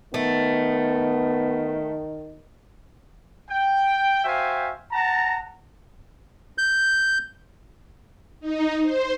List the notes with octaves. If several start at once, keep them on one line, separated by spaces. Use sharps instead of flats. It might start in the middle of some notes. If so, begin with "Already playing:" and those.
D#3 A3 B3
G5
F#4 C5 E5 F5 G5 G#5
F#5 A5 A#5
G6
D#4
C5